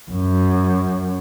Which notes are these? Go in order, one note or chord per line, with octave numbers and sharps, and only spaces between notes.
F#2